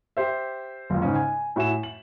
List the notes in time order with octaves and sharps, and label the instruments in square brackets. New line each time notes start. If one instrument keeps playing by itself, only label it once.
[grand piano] G4 C5 E5
F#1 C#2
G#2 C#3 C#4
G#5
A2 F#4 E5 G#5 E7
F#7